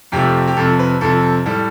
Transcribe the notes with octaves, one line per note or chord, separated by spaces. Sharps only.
F2 C3 F3 A3 G4
G4
F2 C3 F3 A4
B4
F2 C3 F3 A4
A2 G3 A4